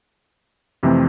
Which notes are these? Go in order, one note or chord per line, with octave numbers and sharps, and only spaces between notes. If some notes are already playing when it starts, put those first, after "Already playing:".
F2 C3 E3 A3 C4